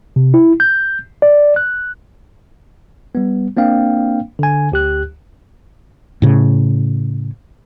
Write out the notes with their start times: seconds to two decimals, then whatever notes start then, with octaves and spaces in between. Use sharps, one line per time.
0.16 C3
0.34 E4
0.60 G6
1.22 D5
1.56 F#6
3.15 G3 B3
3.57 A#3 C4 D4 F5 G5
4.39 D3 G#5
4.72 D2 G4 F#6
6.22 A2 C#3